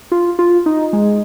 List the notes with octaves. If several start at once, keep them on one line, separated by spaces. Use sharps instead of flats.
F4
F4
D#4
G#3